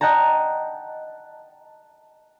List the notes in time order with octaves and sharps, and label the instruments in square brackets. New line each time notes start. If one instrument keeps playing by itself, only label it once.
[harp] D#5 F#5 G5 A5 A#5